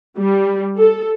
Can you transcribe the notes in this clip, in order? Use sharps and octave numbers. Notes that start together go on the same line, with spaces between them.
G3
A4